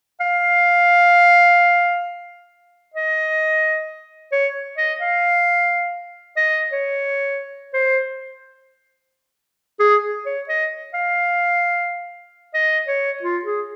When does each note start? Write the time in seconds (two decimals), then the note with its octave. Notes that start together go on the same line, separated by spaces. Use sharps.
0.20 F5
2.94 D#5
4.32 C#5
4.77 D#5
5.00 F5
6.37 D#5
6.72 C#5
7.74 C5
9.80 G#4
10.26 C#5
10.49 D#5
10.94 F5
12.54 D#5
12.88 C#5
13.23 F4
13.45 G#4